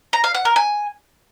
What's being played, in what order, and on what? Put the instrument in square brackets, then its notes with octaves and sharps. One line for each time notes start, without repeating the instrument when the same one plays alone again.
[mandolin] A#5
F5
F#5
A#4
G#5